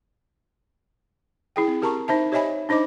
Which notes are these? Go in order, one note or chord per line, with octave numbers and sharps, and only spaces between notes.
E4 G#4 G5
C4
G4 A#4 A5 A#5 C#6
D#4 C5 E5 A5
G4 C#5 D#5 E5 G#5 B5
D4 D#4 C5 D#5 D6